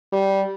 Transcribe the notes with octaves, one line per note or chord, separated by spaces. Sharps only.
G3